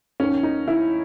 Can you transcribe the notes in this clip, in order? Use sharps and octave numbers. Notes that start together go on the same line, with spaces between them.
D#2 D#3 C#4
D#4
E4